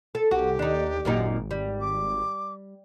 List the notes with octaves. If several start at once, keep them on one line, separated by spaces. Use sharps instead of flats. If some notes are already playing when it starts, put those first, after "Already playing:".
A4
C2 F#4 G4
D#2 D4 D#4
G#1 F#2 A#2 D#4
G3
D6